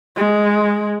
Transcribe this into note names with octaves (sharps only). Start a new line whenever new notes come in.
G#3